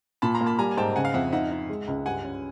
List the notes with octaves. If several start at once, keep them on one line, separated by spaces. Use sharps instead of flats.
A#2 A5 B5
A#5 C6
A#3
A5 B5
G3 G#5 A#5
G#5
G#2 G5 A5
C#3 F#5 G#5
F5
F2 E5 F#5
D#4 E5 F#5
D#4
G#3
C#2
G2 F#5 G#5
C#4